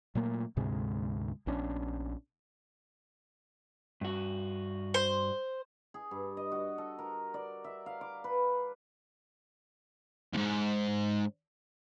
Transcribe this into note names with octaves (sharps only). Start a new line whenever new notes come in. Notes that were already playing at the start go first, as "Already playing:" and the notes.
A#2 F#3 A3 A#3
D2 G#2 C3 G#3
A#1 B3 C#4 D4
G2 F#4
C5
G#4
G2
D#5
F#4
A4
A#4
D5
E5
F5
D6
B4
D#2 G#2